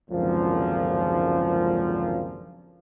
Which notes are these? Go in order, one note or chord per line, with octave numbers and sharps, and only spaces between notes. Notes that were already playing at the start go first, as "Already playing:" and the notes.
G#1 C#2 F#2 A#2 D3 F3